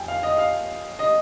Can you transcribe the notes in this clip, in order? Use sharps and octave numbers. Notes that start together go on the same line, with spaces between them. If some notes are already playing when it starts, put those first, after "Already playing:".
Already playing: F2 G5 G#5
F5
D#5
F5
D#5